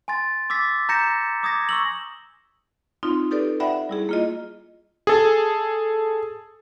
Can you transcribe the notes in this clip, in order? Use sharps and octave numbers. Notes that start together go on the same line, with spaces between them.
G#5 C6 A6
D6 E6 A6 B6
A#5 G6 A#6 C#7 E7
D6 D#6 G#6 A#6
C#6 E6 F#7
C4 D#4 F4 C6
D#4 G4 A4 B4 D5
D5 E5 F#5 G5 B5
G3 E4 G#4
A#3 F4 D#5
G#4 A4